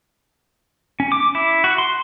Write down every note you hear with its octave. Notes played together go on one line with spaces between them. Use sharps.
C#4
D6
E4
F#4
C6